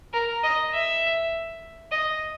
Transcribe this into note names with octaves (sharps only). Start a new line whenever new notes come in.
A#4
D#5
E5
D#5